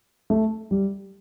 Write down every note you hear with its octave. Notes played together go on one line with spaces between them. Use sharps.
A3
G3